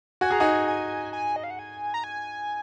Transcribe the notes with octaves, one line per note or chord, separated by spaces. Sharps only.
F#4 G#5
G#4 A#5
D#4 F#4 G#5
G#5
G#5
D#5
F5
F#5
G#5
A#5
G#5